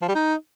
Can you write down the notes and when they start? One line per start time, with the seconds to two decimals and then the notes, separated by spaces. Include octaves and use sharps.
0.02 F3
0.08 G3
0.15 D#4